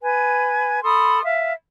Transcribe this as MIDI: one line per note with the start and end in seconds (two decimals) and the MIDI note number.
0.01 0.81 71
0.01 0.81 80
0.83 1.22 69
0.83 1.22 83
0.83 1.22 84
0.83 1.22 87
1.23 1.51 76
1.23 1.51 77